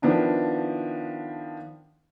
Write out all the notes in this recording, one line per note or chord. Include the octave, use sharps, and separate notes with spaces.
D#3 F3 B3 D4 E4